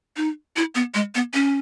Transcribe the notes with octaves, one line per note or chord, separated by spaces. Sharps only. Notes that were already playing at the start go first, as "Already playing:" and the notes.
D#4
E4
B3
G#3
B3
C#4